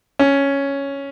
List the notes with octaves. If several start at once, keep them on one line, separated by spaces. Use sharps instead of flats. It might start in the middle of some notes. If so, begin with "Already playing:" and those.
C#4